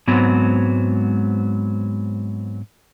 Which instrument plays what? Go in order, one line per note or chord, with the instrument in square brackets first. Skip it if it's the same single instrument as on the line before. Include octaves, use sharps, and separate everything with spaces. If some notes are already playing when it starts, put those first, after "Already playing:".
[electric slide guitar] G#2 F#3 G#3 B3 C4